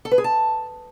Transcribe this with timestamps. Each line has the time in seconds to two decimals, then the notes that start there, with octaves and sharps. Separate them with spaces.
0.05 A4
0.11 B4
0.18 G#4
0.24 A5